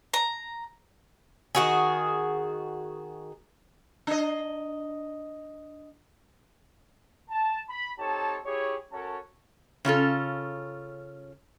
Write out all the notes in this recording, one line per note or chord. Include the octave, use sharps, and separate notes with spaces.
A#5
D#3 F#4 G#4
D4 D#5
A5
B5
C4 D#4 G4 A4 C#5 A5
E4 G4 G#4 C#5
C#4 F#4 A4 A#4 C#5 A5
C#3 C#4 F4 A4